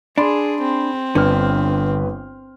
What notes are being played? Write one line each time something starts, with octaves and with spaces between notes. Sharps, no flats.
D4 G#4 B5 C6
C4
G1 D3 B4 F6